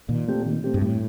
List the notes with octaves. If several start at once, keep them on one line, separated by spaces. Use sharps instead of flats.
A#2 D#3
A3 C4 G4
D#3
A3 C4 G4
G2
A2 G3